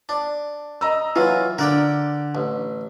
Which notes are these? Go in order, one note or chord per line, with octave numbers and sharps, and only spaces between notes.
D4
D#5 A#5 E6
E3 F#3 F4
D3 A#4 D5 G5
A1